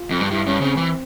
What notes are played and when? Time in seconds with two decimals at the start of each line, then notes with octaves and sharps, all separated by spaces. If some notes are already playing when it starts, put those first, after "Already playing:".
Already playing: F4
0.11 F2
0.21 G2
0.31 G2 E4
0.46 G2 C#4
0.61 C#3 C4
0.77 E3